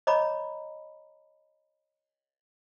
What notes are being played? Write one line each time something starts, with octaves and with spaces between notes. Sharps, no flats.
C#5 D#5 A#5 B5 D6